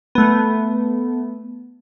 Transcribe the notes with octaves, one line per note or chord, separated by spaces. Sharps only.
A3 B3